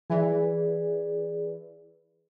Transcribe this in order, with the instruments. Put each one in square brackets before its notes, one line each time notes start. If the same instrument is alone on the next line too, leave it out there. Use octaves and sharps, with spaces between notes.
[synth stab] E3 [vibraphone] G#4 B4 D5